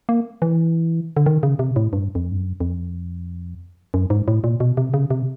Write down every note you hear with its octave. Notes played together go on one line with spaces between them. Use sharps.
A#3
E3
D3
D#3
C#3
C3
A2
G2
F2
G2
F#2
F2
F#2
G#2
A2
A#2
B2
C3
C#3
C3